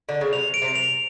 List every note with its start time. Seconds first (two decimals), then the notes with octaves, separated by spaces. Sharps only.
0.09 D3
0.21 C#3
0.33 C3 F7
0.54 D7
0.62 C3
0.76 F7